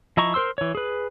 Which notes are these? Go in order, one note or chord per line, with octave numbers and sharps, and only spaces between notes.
F3 E4 D#5 A#5 C#6
A#4 C5 C6 E6
E3 C#5
G#4 B4